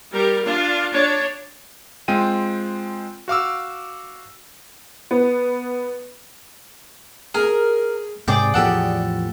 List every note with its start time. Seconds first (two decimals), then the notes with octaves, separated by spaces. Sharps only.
0.11 G3 G4 A#4
0.43 D4 F4
0.92 D4 C#5
2.08 G#3 C4 F4 G5 D#7
3.28 F#4 F5 D6 E6
5.11 B3
7.35 G#4 A#4
8.28 G#2 C3 G#4 D5 G5
8.54 E2 A2 F3 G4 A4 F#5